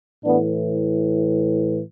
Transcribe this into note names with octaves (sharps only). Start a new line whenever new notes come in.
A2 E3 B3 D4